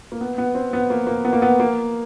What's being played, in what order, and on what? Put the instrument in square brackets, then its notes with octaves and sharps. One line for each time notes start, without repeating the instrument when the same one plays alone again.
[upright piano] A#3
B3
B3
C4
B3
A#3
A#3
B3
A#3
B3
A#3